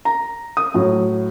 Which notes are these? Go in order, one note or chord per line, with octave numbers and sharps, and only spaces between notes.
A#5
D#6
A2 F#3